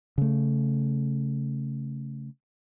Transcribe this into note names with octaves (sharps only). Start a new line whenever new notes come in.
C#3 A3